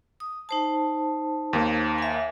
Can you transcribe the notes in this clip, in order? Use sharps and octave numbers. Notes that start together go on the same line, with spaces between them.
D#6
D#4 C5 A5
D#2 A#3
E5 G#5